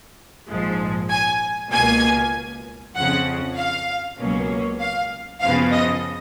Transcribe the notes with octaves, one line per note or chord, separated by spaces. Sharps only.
A#1 G#2 F3 G#3
G#5
C#2 B2 A#3 G#5
F2 C#3 F3 F#5
F5
C#2 B2 F#3 A#3 C#4
F5
F#2 C#3 F3 B3 F5
D#5